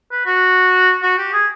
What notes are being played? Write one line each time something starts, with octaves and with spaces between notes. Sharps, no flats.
B4
F#4
F#4
G4
G#4